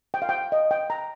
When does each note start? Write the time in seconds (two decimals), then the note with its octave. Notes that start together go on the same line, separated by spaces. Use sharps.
0.14 G5
0.22 F5
0.29 G5
0.52 D#5
0.71 G5
0.90 A#5